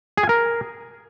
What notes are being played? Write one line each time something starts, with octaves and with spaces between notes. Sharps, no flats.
G#4
G#5
A#4